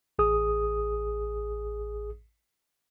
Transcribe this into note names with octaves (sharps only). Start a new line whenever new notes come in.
A1 G#4 D#6